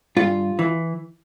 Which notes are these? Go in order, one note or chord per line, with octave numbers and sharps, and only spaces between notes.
G2 F4
E3